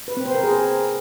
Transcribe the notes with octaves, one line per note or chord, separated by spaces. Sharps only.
B4
C4
C5
A#4
G#4